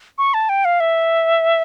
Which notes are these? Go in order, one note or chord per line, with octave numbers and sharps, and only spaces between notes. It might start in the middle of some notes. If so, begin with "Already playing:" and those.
C#6
A5
G5
F5
E5